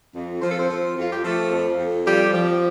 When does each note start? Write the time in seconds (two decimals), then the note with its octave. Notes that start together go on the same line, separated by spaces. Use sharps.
0.15 F2
0.42 F3 C5
0.51 A4
0.58 C4 C5
0.70 F3
0.97 F2 F4
1.11 G4
1.24 F3 A3 A4
1.51 F2
1.79 F2
2.05 F3 G3 G4
2.33 F3